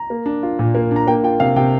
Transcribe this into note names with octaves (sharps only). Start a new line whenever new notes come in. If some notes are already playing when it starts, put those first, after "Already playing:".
Already playing: A#5
A#3
D4
F4
A#2
A#3
D4
A#5
A#3 G5
F4 G5
C3 F5
C3 G5